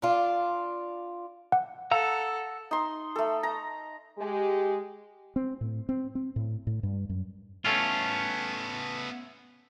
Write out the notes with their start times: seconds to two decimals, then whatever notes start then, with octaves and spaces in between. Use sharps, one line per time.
0.02 D4 F4
1.52 F#5
1.91 A4 F5 F#5 A#5 E6
2.71 D#4 C6
3.16 A3 A4
3.43 A#5
4.19 G#3 G4
5.36 C4
5.61 A2
5.89 C4
6.15 C4
6.36 A2
6.67 A2
6.83 G2
7.09 F#2
7.65 A3 B3 C#4 F4 A4